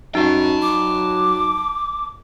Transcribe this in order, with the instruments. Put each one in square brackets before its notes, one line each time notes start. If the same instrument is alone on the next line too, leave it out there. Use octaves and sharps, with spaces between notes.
[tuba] F#2 [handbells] D#4 F#4 [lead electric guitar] G5 A5
[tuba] F#3 [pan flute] D6